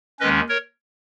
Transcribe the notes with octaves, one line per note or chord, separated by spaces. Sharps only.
D#2 D#3 G#3 C#4 B4 D#5
A#4 C#5